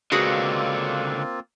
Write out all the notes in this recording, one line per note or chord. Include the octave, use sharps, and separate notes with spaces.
C#2 D3 A#3 C4 F4 F#4 G#4 B4